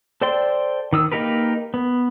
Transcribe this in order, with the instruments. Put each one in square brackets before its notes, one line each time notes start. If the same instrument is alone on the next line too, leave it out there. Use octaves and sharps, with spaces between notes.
[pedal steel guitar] A4 C5 D5 G5 C6
D#3 D#6 E6
A#3 D#4 G4 A#4 B4
B3